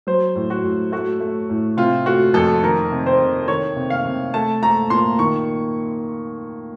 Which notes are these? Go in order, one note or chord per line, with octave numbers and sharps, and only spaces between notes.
F#3 C5
A2
F#4
A2
A3 F#4
A3
A2
C3 F4
A3 F#4
F2 A4
D#3 A#4
C3
C5
C3
D#3 C#5
C3
F5
C3
A3 A5
A3 A#5
A#2 C6
D#3 C#6